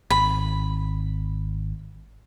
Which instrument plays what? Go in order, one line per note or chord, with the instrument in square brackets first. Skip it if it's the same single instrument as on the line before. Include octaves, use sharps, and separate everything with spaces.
[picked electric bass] G#1 [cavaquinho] B5